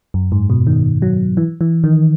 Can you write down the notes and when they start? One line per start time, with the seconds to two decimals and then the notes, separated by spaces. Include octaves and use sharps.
0.14 F#2
0.32 G#2
0.50 B2
0.67 D#3
1.02 F#3
1.37 E3
1.61 E3
1.84 D#3